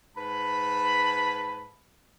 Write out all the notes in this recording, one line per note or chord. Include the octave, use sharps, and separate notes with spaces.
G#2 B4 A5 B5